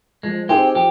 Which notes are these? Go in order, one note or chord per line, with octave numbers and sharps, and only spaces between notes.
F3 G#3
C4 D#4 G4 G#4 C5
F3 G4